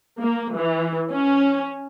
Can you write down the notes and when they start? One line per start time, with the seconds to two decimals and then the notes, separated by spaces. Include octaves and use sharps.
0.18 A#3
0.53 E3
1.09 C#4